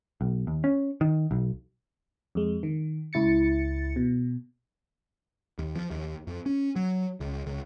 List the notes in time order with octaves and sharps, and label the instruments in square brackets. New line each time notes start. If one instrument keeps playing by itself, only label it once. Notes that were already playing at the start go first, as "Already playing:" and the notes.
[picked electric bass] B1
D#2
C#4
D#3
B1
[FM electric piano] F2 G#3
D#3
C#2 E4 A6 C#7
B2
[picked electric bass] D#2
F3
D#2
F2
C#4
F#3
C#2
C#2